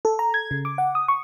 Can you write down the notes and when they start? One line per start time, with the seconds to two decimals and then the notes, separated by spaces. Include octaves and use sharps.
0.05 A4
0.19 A#5
0.34 G#6
0.51 C#3
0.65 D6
0.78 F#5
0.95 D#6
1.08 C#6